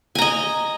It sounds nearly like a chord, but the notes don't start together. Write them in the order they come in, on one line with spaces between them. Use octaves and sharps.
G#5 A#5 D#5